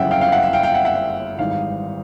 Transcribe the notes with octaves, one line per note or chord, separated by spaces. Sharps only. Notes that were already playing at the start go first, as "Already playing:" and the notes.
Already playing: G1 F#2 C#3 E3 E5 F#5 G5
F5 G5
F5 G5
E5 F#5
E5
F5 G5
F5 G5
E5 F#5
E5 F#5
G#1 G#2 E3 G3 F5